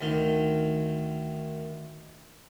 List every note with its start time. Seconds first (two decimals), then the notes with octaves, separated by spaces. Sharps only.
0.01 D2 D#3